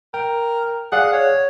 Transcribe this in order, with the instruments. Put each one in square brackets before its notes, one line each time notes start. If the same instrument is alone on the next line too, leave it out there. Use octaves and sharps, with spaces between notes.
[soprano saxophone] A#4 [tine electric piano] G5
[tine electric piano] G#4 D5 F5 [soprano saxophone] F#5
[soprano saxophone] C#5